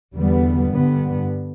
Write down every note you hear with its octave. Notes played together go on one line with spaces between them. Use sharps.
E2 D3 G3 B3
G2 D3 G3 B3